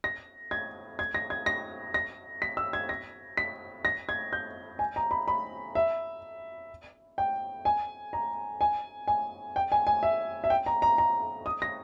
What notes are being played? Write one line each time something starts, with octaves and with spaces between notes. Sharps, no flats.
A#6
G#6
G#6
A#6
G#6
A#6
A#6
B6
E6
G#6
A#6
B6
A#6
G#6
G6
G#5
A#5
B5
B5
E5
G5
G#5
A#5
G#5
G#5
G5
G#5
G#5
E5
E5
G5
A#5
A#5
A#5
D#6
A#6